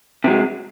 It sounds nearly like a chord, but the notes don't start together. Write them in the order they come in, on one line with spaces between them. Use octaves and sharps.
C3 F#3 G#3